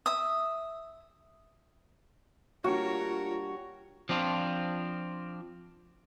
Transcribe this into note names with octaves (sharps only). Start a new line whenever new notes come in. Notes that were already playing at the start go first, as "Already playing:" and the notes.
E5 D#6
G3 A#3 D4 F4 F#4 A#4 C#5
F3 C4 D4 F4